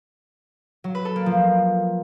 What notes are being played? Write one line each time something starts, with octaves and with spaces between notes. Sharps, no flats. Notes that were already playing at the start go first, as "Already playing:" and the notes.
F#3
B4
A4
A#3
F3